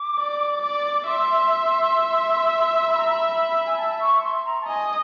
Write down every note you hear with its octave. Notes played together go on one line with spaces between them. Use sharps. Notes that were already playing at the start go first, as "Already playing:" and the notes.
Already playing: D6
D5
D5
E5 C6
B5
A#5
B5
B5
G#5
A5
C#6
C6
A#5
A5
D#5 G#5